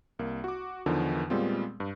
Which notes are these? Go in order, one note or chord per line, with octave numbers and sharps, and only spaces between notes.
C2 A#3
F#4 D6
E2 D3 D#3 F3
A#2 G3 G#3 B3 C4 F4
G2